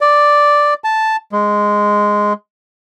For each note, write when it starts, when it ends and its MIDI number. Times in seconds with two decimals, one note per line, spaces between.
0.01 0.74 74
0.84 1.16 81
1.32 2.33 56